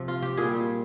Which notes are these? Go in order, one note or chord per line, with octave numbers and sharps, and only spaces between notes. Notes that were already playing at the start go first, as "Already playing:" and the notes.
Already playing: C3 F3
F4
G4
A#2 G3 G#4